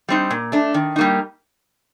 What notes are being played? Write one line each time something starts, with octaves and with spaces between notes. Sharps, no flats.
G3 C4 D#4
A#2
A3 D4
D#3
G3 A#3 D#4